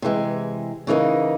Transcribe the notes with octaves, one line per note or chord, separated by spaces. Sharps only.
C3 E3 G#3
C#3 E3 G3 A#3 D#4